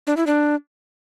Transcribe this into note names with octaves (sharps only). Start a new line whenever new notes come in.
D4
E4
D4